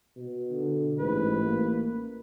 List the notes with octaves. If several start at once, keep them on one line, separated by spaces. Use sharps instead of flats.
B2
D3
A1 G#2 B4
A#3